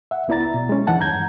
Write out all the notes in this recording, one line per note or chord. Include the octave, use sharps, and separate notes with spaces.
E5 F#5
C#2 B3 E4 D5 A#5 A6
B2
G#3 C#4
E2 E3 D#4 F#5 A5
G2 D#3 A#5 G6 G#6